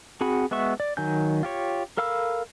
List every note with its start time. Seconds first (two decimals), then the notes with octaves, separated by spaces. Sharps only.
0.21 C4 F#4 G#4 F#5 B5
0.51 G#3 B3 F#4 E5 C#6
0.80 D5
0.97 D#3 F#3 G#5 G6
1.43 F4 G4 C#5
1.97 A4 A#4 F5 B5 E6